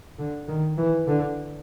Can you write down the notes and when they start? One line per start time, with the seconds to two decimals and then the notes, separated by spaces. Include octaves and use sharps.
0.19 D3
0.48 D#3
0.78 E3
1.07 D3